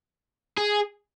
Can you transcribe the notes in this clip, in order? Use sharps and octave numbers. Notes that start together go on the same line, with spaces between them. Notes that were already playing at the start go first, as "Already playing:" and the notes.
G#4